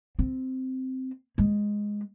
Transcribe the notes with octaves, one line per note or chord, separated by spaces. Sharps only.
C4
G#3